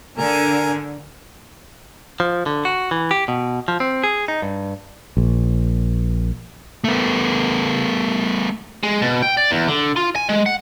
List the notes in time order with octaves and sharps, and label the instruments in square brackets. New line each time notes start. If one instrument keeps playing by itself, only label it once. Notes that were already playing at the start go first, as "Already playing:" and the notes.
[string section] D3 [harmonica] A#4 G#5
[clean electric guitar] F3
D3
F#4
E3
G4
B2
F3
C4
G#4
D#4
G2
[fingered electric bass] A#1
[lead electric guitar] A3 B3
[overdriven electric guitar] G#3
B2
G5
D5
E2
D3
F4
G#5
G#3
F#5